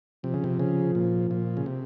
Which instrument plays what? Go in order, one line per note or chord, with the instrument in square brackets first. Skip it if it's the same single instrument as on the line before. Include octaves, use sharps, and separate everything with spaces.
[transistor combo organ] C3 [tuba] F3
[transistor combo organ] C#3
C3
C#3
A#2
A#2
C#3
C3